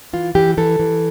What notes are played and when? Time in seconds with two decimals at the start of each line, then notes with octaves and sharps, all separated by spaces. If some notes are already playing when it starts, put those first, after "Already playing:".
0.13 E3 F4
0.35 E3 G4
0.57 E3 A4
0.80 E3